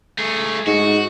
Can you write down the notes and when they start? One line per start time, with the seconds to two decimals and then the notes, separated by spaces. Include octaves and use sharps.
0.18 A3 G#4
0.67 G#2 F#4